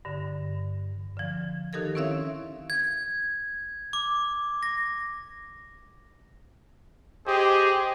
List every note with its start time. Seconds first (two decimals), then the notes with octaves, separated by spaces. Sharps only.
0.05 G2 D3
1.17 D3 F3
1.73 D#3 D#4 G4 A4 A#4 G#6
1.95 C4 C#4 E4 C#5 E5 F5
2.70 G#6
3.93 D6
4.63 A#6
7.27 G4 G#4 C5 D#5